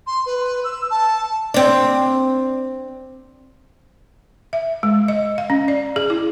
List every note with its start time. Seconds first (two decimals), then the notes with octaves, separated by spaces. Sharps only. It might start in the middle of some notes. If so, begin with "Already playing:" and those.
0.07 C6
0.26 B4
0.64 E6
0.90 A5
1.54 C4 D4
4.53 E5
4.83 G#3
5.08 D#5
5.38 F5
5.50 C#4
5.68 D5
5.96 G#4
6.10 E4